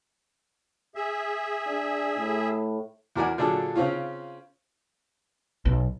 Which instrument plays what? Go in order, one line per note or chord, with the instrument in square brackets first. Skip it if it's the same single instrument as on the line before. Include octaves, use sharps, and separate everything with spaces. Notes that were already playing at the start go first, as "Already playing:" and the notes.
[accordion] G#4 E5
[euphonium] D4
A2
[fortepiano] E2 F#4 A#4 D5 G#5
A#2 D3 F#3 D4 G#4 A4
C#3 C4 C#4 F4
[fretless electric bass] B1